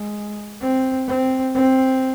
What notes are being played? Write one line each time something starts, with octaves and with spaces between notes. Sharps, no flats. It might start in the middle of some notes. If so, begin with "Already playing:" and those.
Already playing: G#3
C4
C4
C4